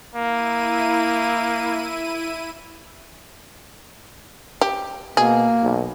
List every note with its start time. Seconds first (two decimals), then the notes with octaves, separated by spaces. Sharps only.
0.15 A#3 E4 D#7
4.61 G4
5.17 B2 A#3 G#4
5.63 B1